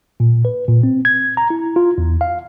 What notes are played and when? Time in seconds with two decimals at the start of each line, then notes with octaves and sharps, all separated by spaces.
0.20 A#2
0.45 B4
0.68 A#2
0.83 C4
1.05 G#6
1.37 A#5
1.50 E4
1.76 F4
1.98 E2
2.21 F5